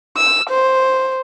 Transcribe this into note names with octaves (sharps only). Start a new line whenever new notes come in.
E6
C5